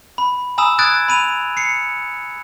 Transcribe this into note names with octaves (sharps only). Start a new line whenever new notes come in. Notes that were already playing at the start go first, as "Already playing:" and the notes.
B5
G#5 A#5 B5 D#6 E6 E7
D#6 F#6 G#6 A6 D7
B5 D#7 F7
C7 C#7